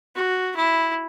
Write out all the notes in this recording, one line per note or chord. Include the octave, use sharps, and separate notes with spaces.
F#4
E4